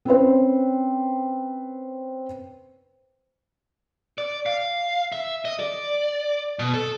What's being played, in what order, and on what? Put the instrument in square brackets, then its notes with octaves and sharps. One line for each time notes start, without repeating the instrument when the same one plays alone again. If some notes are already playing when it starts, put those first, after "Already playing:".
[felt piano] C4 C#4 B4 C5
[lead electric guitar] D5
F5
E5
D#5
D5
B2
A4